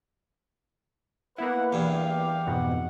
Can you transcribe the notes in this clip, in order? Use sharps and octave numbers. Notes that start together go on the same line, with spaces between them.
A#3 B3 E4 B4 F#5
E2 G2 G4 F5
F2 G#2 B2 F#5